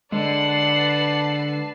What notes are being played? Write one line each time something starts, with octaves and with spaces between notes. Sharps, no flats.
D3 G#3 B4 D5 F#5 A5 C7